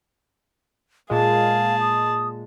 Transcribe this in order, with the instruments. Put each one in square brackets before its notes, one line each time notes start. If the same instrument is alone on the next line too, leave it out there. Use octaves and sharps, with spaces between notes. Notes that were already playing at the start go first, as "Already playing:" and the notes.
[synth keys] A#2 G#3 [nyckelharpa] G#4 A5 [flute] F5
[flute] D#6